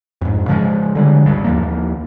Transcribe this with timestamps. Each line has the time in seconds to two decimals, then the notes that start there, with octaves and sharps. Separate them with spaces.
0.21 F2 G#2
0.48 C#3 F3 G3 G#3
0.95 D3 G3 G#3
1.26 G1 C#2 G2
1.44 D#2 F3 A#3